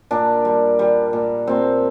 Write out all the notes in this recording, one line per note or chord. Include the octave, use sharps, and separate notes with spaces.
A#2 D4
G3
G3
A#2
A#2 C4